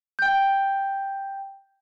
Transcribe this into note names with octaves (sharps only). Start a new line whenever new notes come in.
G5 G6